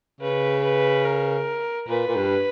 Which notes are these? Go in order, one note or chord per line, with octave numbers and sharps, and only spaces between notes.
C#3 B4
B4
A#4
A#2 B4
A#2
G2